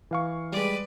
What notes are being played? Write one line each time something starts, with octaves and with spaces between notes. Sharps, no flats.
E3 F5 C#6
G3 G#3 B4 D5